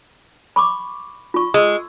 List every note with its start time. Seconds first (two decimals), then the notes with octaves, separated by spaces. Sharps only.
0.56 B5 C#6 D6
1.34 F4 C#6
1.54 G#3 E6